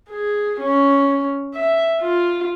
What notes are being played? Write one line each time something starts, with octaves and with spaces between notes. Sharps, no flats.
G#4
C#4
E5
F4